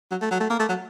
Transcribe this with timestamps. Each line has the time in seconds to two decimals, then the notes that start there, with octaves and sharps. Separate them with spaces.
0.11 F#3
0.21 A3
0.31 F#3
0.40 A3
0.50 A#3
0.59 A3
0.69 F#3